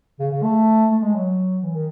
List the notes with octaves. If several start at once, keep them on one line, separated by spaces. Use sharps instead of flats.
C#3
C#3
A3
A3
G#3
F#3
E3
D#3